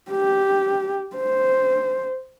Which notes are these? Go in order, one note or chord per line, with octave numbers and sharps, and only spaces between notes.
G4
C5